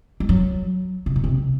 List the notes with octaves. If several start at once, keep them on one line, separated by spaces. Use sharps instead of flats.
G3
F#3
C3
A#2
C3